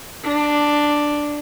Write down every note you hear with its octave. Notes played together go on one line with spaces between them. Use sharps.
D4